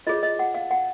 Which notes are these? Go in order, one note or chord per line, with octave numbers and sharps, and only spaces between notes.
F4 G#4 C#5 D#5
D#5
F#5
F5
F#5